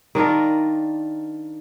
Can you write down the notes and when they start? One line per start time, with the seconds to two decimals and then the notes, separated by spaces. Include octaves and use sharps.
0.15 D#3 D4 F4 A#4